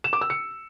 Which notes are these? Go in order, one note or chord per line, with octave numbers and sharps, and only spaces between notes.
E7
D6
E6
C#7